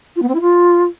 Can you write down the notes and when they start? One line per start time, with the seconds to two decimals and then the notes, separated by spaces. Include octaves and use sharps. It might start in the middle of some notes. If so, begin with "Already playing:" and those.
0.16 F4
0.22 B3
0.28 C4
0.35 E4
0.41 F4